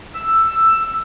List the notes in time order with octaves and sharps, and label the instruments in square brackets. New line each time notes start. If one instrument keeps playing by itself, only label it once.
[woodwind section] E6